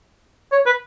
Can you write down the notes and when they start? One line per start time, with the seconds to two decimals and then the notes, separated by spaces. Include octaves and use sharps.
0.52 C#5
0.66 B4